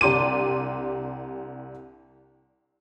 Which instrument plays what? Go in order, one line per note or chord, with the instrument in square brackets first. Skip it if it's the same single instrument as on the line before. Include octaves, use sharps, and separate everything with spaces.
[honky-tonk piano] C2 D4 G4 C6 D6 D#7